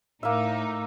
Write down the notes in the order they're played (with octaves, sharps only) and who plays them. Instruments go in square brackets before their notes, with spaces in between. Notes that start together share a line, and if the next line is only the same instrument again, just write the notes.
[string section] A2 D#4 [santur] A#3 E5